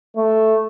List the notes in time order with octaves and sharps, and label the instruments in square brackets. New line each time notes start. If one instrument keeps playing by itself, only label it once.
[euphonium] A3